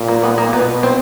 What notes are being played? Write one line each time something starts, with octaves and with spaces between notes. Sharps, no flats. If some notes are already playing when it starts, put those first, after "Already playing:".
Already playing: A#2
A#3
B3
A#3
B2 B3
C4